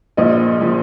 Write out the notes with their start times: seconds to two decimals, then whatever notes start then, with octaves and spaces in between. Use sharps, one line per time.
0.17 A#1 A#2 F3 D#5
0.61 A#2 F3